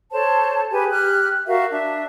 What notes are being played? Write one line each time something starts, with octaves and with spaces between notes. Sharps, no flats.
A4 C5 C#5 A5
G4 G#4 B4 G#5
G4 F6 F#6
F#4 A#4 E5 F5
D4 E5